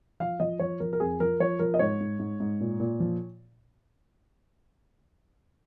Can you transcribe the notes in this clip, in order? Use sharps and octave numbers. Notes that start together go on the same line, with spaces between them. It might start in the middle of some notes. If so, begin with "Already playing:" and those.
F3 F5
F3 D#5
F3 C#5
F3 A#4
A#4
F2 G#4
F3 A#4
F3 C#5
F3 A#4
D#5
G#2 C#5
G#2
G#2
G#2
A#2
A#2
F3